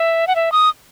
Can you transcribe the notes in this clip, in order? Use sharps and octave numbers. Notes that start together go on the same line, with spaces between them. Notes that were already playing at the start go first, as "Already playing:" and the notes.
Already playing: E5
F#5
E5
D#6